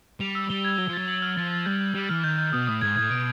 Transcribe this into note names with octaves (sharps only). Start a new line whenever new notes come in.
G3 F7
E6
G3 G7
G#6
F#3 G7
F3
F#3 A6
F#7
F6
F3 A6
A6
G3 G6
G6
G3 F#7
E3 F6
D#3 G6
G6
B2 D#6
A2 D#6
G#2 G#6
A2 G#6
B2 D7